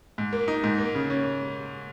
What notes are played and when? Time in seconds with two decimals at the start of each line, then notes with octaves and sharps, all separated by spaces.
0.18 G#2
0.33 A#3
0.48 D#4
0.64 G#2
0.78 A#3
0.95 C#3
1.10 C#4